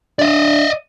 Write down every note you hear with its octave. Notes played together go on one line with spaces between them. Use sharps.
D4 D5 D#5